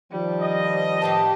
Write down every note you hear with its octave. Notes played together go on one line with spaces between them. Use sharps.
D#3 F3 G3
D#5
A2 G4 B4 A5